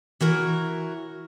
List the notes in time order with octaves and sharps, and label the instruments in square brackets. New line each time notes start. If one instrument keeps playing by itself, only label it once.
[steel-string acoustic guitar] E3 F#4 A#4 C#5